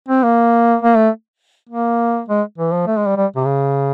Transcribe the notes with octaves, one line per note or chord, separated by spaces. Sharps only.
C4
A#3
A#3
A3
A#3
G#3
E3
F3
A3
G#3
G3
G3
C3
C#3